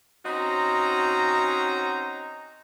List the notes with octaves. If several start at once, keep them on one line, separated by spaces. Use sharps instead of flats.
C4 C#4 D#4 F#4 A#5